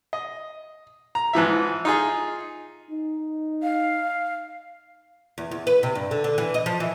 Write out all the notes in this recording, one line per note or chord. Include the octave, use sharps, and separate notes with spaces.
D#5
A#5
G#2 E3 F3 E5
D#4 F4 G#4
D#4
F5
E2
E2
B4
C3
G2
D3
D3
E3
D#5
F3
E3